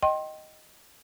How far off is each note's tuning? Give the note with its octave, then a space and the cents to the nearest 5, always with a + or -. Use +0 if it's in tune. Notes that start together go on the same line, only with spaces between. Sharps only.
D#5 +0 G5 -20 C6 +30